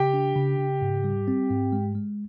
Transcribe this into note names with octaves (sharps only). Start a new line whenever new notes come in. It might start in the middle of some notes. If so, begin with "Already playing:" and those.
Already playing: C#3 G4 G5
D4
C#3
C#3
G#2
G3
C4
G#2
G#3
G#3